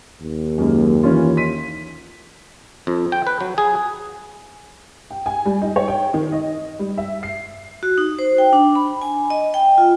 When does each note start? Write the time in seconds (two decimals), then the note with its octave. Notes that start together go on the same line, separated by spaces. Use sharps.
0.22 D#2
0.58 F#2 G#3 A#3
1.03 E3 C#4 F4
1.37 C6 B6 D#7
2.87 F2
3.12 G5
3.27 B4
3.41 F#3
3.58 G#4
5.11 G5
5.26 G#5
5.45 G3
5.62 D#4
5.76 C#5
5.88 G5
6.14 D#3
6.32 D#5
6.79 G3
6.98 E5
7.23 C7
7.83 F#4
7.98 D#4
8.19 C5
8.38 G5
8.53 D4
8.75 B5
9.02 G#5
9.30 D#5
9.54 G5
9.78 F4